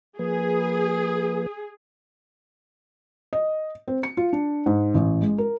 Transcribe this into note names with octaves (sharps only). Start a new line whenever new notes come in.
F3 A#3 G#4 B4
D#5
C4
C#7
F4
D4
G#2
A1
G#3
A#4